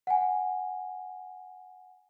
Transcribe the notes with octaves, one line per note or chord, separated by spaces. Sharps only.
F#5 G#5